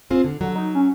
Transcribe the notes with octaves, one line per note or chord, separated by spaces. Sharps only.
C4 F4 G#4
D3
D3 F#3
D#4
C#4